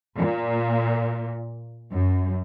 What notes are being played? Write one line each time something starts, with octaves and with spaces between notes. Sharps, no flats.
A#2
F#2